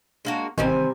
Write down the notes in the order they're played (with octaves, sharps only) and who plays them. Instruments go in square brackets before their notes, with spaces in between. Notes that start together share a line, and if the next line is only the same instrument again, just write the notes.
[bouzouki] G#3 A#3 F#4 [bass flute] D4
[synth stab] A1 D#3 [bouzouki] C3 G3 G#5 [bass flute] C4